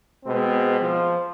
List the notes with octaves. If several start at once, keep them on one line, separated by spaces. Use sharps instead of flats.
B2 G#3 C4
F3